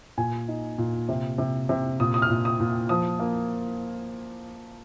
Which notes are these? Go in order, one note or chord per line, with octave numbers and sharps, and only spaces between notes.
A#2 G#5
D#4
A#2
C3
C3
C3
A#2 D#6
D#6
F6
A#2
D#6
A#2
F3 D#6
A#3